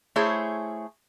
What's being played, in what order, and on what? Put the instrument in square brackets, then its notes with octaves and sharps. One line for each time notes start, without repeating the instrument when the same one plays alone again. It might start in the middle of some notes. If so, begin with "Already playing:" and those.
[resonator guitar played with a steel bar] A3 E4 G#4 C5 C#5